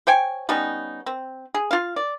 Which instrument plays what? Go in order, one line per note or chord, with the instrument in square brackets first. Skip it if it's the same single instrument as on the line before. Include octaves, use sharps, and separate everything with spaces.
[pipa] C5 C#5 G5 G#5
G3 B3 C#4 D#4
C4
G#4
F4 F5
D5